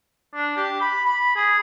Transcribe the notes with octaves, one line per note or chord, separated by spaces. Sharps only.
D4
G4
B5
B5
G#4